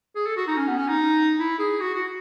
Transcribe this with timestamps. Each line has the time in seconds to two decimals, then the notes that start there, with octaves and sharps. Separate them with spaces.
0.15 G#4
0.26 A4
0.37 F#4
0.47 D#4
0.57 C#4
0.67 B3
0.77 C#4
0.88 D#4
1.39 E4
1.59 G#4
1.80 F#4
1.94 F#4